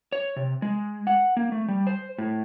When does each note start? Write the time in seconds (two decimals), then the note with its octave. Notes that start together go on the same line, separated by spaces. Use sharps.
0.12 C#5
0.36 C3
0.62 G#3
1.07 F#5
1.37 A#3
1.52 A3
1.68 G3
1.87 C5
2.18 A2